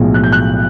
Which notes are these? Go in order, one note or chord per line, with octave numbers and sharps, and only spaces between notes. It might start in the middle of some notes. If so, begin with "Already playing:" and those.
Already playing: B1 A2 F3 G#3
F#6
G6
F#6